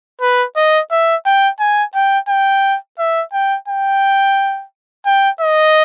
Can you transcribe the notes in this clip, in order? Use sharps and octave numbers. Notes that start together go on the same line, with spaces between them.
B4
D#5
E5
G5
G#5
G5
G5
E5
G5
G5
G5
D#5